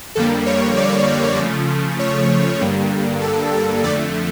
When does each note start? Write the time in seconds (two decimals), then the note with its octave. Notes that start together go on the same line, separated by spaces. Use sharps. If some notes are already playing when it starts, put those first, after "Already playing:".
0.15 F2 D3 G3 A#3 A4
0.46 C#5
0.77 D5
1.39 C#3 F3 A3
1.99 C#5
2.61 G2 D3 G3 A#3
3.21 A4
3.53 A4
3.84 F2 D3 A3 D5